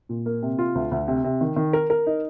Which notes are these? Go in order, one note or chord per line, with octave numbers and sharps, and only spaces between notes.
A#2
A#3
C3
F4
D2
D2
C3
C3
D#3
D#3
A#4
A#4
D#4